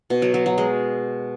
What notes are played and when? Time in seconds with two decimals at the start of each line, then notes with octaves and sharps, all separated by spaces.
0.10 B2
0.22 F#3
0.34 F#3
0.46 F#3
0.58 G#3